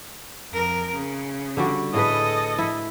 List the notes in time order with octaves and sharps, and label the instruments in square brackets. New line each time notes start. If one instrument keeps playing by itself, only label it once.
[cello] F2 A#4
C#3
[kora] D3 G3 F#4
[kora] A2 G#4 B4 [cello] A4 D#5
[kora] E4